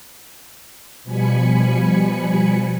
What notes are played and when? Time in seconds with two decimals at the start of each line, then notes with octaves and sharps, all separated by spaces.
1.04 B2 F3 G3 G#5 B5 C#7